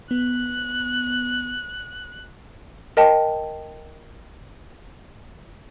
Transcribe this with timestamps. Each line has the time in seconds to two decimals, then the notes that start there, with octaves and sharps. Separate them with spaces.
0.11 B3 F#6
2.97 A#4 D#5 G5 A5